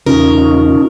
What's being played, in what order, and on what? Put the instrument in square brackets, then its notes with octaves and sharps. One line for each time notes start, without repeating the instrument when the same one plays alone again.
[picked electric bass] E1 C#3 [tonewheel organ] C#4 D#4 F4 [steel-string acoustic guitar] A#4